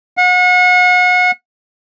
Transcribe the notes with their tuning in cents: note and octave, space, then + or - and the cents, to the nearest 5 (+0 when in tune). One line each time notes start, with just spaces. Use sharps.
F#5 -35